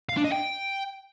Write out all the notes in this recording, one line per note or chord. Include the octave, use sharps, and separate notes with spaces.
F5
D4
D#5
G5